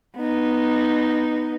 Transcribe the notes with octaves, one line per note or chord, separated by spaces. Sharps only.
B3 D#4